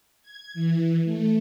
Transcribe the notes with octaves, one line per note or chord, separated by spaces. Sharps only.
G#6
E3
A3